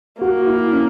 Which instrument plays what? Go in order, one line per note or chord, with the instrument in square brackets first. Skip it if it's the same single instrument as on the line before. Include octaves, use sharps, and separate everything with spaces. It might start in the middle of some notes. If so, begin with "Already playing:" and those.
[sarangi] A#3 [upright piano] F#4
[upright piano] E4
C#4